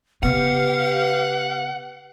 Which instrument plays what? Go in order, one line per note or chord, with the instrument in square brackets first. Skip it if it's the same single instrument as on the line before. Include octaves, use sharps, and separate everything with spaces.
[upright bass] C#3 B3 [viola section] G4 F5 [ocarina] B4 [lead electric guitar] F#5